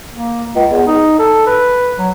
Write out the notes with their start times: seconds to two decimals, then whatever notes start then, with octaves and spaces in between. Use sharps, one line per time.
0.14 A#3
0.55 C#2
0.70 E2
0.87 D#4
1.19 A4
1.47 B4
1.98 F#3